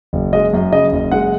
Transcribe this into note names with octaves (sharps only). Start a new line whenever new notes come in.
F#1
G#3 D#5
F#2
C#3 D#5
F#1
G#3 F#5